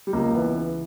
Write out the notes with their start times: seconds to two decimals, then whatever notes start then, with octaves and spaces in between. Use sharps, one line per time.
0.07 G3
0.13 C#2 A#3
0.35 E3 B3
0.56 C#3